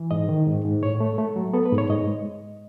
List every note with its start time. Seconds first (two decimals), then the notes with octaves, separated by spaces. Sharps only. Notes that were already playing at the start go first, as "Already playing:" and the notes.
Already playing: E3
0.11 G#2 D#5
0.29 D#3
0.47 G#2
0.65 G#2
0.82 A2 C#5
1.00 A3
1.18 A3
1.36 F#3
1.53 B3 A4
1.65 B4
1.72 G#2
1.78 C#5
1.89 G#2 D#5
2.07 G#3